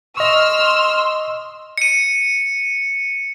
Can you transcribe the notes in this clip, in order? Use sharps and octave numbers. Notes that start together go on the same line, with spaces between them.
D#5 C6 C#6 E6 F6
C#7 D#7